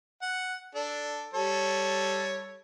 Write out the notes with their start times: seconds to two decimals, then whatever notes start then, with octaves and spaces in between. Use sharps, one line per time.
0.22 F#5
0.75 D4 A4
1.34 G3 A4 C#5